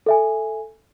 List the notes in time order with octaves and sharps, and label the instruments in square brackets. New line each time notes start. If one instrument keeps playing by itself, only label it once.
[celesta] A4 E5 G#5